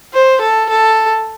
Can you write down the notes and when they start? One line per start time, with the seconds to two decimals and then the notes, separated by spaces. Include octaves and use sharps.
0.13 C5
0.41 A4
0.70 A4